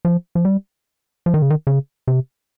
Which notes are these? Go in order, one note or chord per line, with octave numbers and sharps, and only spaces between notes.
F3
F3
G3
F3
D#3
C#3
D#3
C#3
C3